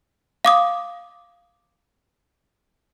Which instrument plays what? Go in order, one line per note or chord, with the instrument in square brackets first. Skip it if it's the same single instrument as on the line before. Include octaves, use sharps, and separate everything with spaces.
[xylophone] F5 D6 D#6